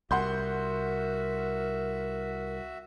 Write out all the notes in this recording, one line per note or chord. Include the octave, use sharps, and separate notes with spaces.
C2 F#4 A#4 E5 F#5 C6 G6